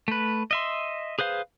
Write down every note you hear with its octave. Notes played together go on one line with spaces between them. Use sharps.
A3 B4
D#5 E5 C6
G#4 B4 C5 F5